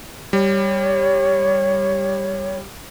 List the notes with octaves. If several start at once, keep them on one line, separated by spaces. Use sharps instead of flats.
G3 C#5